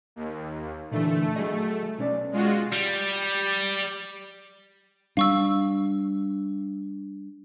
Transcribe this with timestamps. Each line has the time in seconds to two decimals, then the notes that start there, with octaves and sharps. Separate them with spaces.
0.16 D#2
0.91 A#2 D3 E3 A3
1.36 F#3 G#4 D#5
1.98 B1 C#4 D5
2.32 G#3 F4 F#4
2.73 G3
5.17 G3 D4 F5 C#6 E6